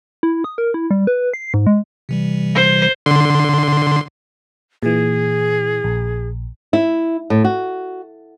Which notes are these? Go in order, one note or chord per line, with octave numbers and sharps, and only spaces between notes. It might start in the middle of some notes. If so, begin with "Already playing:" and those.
E4
D#6
A#4
E4
G3
B4
C7
G#2
G#3
C3 E3 G3
C5
D3 C6
A#2 E3 G#4
A#1
E4
A2
F#4